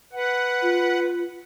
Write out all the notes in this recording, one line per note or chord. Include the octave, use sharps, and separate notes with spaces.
B4 F#5
F4